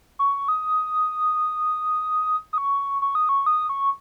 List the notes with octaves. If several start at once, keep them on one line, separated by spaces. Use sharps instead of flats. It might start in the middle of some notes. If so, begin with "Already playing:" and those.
C#6
D#6
D#6
C#6
C#6
D#6
C#6
D#6
C#6